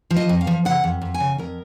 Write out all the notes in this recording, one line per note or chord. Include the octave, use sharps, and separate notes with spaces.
F3
D#5
F2
F5
F3
C#3 F#5
F2
F2
G#5
C#3
F2 A#4